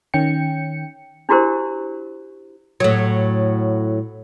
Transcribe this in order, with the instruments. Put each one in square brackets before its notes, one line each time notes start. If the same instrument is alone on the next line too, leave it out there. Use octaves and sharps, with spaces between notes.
[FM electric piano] D#3 C#4 G5 C#7
[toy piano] D4 E4 F#4 G4 A#4 C5
[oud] A2 F#3